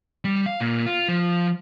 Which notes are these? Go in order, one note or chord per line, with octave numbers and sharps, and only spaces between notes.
G3
F5
A#2
F4
F3